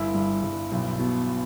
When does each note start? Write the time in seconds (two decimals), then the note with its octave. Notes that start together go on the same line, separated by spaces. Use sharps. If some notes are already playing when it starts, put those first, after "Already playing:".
Already playing: G1 E4
0.15 G2
0.43 G1
0.72 B1
0.99 B2